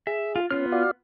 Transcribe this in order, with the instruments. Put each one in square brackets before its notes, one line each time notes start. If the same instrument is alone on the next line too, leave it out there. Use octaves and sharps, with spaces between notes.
[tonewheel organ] G#4 [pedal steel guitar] E5
[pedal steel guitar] F4
[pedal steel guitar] B3 F4 F6 [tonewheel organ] C#4
[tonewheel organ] F#4 D5 F5